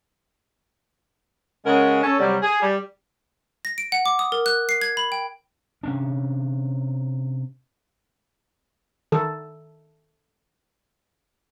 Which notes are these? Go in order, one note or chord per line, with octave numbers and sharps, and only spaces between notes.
C#3 G#3 C#4 A#4 F#5
C#4 A4
C3 F#3 G3
G#4
G3
A#6
D7
F#5
D6
D#6
A#4
F#6
C7
G#6
B5
G5
C3 C#4 D4
D#3 A4